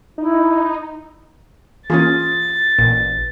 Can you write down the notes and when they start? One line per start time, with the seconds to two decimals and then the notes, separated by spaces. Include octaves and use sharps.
0.18 D#4 E4
1.90 E3 A#3 C#4 F4 G#4 A6
2.79 A1 A#2